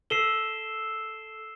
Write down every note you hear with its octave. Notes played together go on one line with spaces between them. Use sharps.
A4 E6 C7 E7 G7